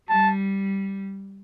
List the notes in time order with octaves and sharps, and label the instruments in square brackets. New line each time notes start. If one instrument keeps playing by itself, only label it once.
[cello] G3 [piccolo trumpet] A5